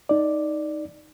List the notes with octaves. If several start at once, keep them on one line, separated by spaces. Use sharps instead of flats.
D#4 D5